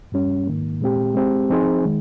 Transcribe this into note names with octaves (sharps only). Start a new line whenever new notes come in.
G2 G3 C#4
G#2 D#3 A#3
A#2 G#3 C4 G4
G#3 C4 G4
F3 C4 D#4 G#4 C5
D#3 G#3